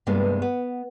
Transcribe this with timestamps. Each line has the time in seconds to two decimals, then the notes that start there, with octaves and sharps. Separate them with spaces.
0.07 G2 C3 G#3 A#3 B3 D4
0.42 B3